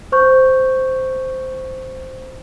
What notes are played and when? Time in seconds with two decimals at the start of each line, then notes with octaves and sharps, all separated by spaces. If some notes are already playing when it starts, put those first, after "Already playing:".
0.12 C5 C#6 G6